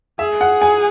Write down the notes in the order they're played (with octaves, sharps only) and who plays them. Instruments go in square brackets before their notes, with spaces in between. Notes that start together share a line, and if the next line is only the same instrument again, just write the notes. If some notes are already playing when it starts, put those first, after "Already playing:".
[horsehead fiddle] G#4 [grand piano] E5
[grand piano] F#5
G#5